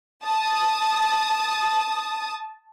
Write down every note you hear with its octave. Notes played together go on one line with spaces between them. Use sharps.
A5 D#6